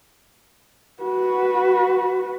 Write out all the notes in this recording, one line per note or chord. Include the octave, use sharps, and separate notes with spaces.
F#4 B4